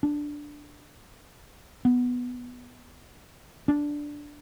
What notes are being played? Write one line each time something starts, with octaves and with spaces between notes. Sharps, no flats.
D4
B3
D4